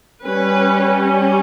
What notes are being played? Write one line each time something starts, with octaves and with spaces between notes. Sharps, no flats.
G3 C#4 B4